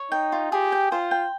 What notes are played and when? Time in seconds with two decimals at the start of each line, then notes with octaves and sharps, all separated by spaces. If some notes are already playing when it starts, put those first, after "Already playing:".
Already playing: C#5
0.12 D#4 G5
0.32 F4
0.52 G4 G#4
0.72 G5
0.92 F4 C5
1.11 G5